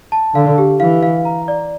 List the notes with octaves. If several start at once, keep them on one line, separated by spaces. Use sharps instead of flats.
A5
D3 F5
G4
E3 F5
F5
A#5
D5